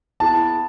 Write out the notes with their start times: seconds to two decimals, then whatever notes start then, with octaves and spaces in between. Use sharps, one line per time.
0.20 B3 E4 G#4 A5